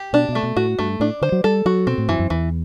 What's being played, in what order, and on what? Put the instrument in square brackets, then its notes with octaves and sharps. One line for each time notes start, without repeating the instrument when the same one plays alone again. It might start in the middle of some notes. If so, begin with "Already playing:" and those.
Already playing: [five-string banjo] G4
[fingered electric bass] B2 [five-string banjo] D4
[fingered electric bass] B2
[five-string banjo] A3
[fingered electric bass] B2
[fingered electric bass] A2 [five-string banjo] F#4
[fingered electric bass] G2 [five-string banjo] A3
[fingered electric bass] A2 [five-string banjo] D4
[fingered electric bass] D3 [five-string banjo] C5
[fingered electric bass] F#3
[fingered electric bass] G3 [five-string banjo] A4
[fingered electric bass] F#3 [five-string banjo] F#4
[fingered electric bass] B2 [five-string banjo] C4
[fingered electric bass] A2
[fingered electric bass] F#2 [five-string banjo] E3
[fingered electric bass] F#2
[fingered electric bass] E2 [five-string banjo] E3